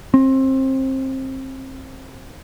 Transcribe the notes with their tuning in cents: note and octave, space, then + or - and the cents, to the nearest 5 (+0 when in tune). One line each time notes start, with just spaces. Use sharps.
C4 +25